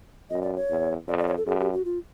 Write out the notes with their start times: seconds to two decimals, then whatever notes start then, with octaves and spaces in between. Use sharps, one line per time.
0.30 F#2 D#5
0.42 D5
0.56 C#5
0.69 E2
1.07 F2 D5
1.18 D5
1.27 C#5
1.37 A4
1.46 F#2 G#4
1.59 G4
1.73 F#4
1.85 F4